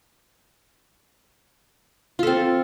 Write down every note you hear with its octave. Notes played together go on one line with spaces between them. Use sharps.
C4 F4 A4